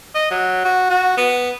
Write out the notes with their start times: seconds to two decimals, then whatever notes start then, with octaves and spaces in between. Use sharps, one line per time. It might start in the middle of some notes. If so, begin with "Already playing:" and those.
0.15 D#5
0.31 F#3
0.65 F#4
0.90 F#4
1.18 B3